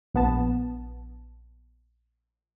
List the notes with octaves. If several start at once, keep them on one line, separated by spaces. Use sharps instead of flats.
A#1 B3 A5